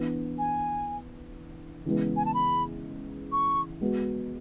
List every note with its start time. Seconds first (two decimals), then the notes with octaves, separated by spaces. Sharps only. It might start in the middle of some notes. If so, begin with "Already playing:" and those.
Already playing: E3 B3 D4
0.38 G#5
1.85 C#3 E3 G#3 B3
2.16 G#5
2.26 A5
2.34 B5
3.32 C#6
3.81 G#3 B3 F#4